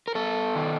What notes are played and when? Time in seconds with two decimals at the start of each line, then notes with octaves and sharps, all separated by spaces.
0.08 A#4
0.15 B3 A4
0.55 D#3